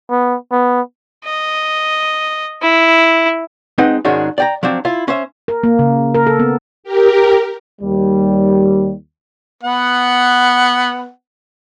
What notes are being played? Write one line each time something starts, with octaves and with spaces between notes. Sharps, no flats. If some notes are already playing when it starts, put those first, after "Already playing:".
B3
B3
D#5
E4
G#3 C4 D#4 B4 D#5 F#5
G#2 D#3 G#3 C#4 D4 F#4
D5 G5 A#5
F3 F#3 C4 D4
E4 F4
C#4 C5 E5
A#4
A#3
C#3
A#4
A4
B3
G4 A#4
D#2 G3
B3 F#5